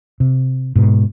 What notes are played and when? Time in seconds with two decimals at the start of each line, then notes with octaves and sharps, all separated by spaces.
0.20 C3
0.75 G#2 B2